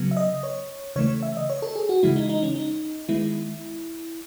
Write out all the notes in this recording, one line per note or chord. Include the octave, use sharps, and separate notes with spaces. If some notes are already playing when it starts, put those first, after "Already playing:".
Already playing: C#3 F#3 B3
E5
D#5
C#5
C#3 E3 A3 C#5
E5
D#5
C#5
A4
G#4
F#4
C#3 E3 G#3 E4
D#4
D#4
C#4
D#4
D#3 G#3 B3 E4